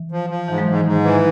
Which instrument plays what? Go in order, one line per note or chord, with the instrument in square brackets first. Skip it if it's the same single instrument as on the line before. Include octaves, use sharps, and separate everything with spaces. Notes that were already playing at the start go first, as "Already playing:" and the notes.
Already playing: [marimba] E3
[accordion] F3
F3
[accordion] G#2 [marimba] E3
[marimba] F#3 G#3
[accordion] G#2 [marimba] E3
[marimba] D#3
[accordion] G#2
E3